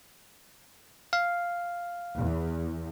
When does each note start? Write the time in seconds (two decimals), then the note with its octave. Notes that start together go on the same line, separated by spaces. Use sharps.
1.13 F5
2.17 E2